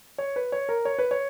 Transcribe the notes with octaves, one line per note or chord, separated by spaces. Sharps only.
C#5
B4
C#5
A#4
C#5
B4
C#5